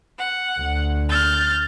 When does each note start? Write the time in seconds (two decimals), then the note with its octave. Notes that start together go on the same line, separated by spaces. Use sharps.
0.18 F#5
0.60 D2
1.08 F6 G6 A6